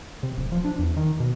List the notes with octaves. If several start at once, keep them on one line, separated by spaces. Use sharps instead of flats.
C3
D1
F3
D4
E2
D#3
B2